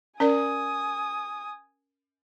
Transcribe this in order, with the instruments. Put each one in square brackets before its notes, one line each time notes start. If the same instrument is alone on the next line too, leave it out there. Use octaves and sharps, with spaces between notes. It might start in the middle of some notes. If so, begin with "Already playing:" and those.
[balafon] C#4 A#4 D5 [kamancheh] G#5 D#6